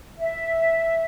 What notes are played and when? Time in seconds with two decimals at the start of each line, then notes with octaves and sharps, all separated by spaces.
0.19 E5